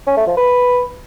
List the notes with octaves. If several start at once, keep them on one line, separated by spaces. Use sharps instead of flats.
C#4
A3
F3
B4